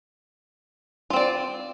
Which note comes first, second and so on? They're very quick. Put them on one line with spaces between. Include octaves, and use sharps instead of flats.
F4 C4 D5